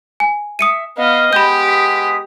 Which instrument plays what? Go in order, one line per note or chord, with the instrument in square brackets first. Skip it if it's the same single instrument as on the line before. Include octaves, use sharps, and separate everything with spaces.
[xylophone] G#5
[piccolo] E5 [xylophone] D#6 C#7 D#7
[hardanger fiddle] B3 [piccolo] D#5 [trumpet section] F5
[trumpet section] G#3 B3 D#6 [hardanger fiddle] G4 [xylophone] B5 G6
[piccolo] B6